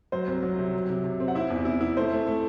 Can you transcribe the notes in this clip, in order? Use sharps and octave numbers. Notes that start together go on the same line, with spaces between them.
F#3 C5
C2
F#3
C3
F#3
C3
C3
C4
F#5
E4 E5
E2
E4
E4
A3 C5
A3
A3